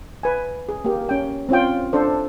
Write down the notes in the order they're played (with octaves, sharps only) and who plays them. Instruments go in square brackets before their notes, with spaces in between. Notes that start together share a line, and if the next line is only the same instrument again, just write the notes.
[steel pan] B4 G#5
G#4
A#3 G4
C#4 G5
C4 C#4 F4 G5
D4 A4 C5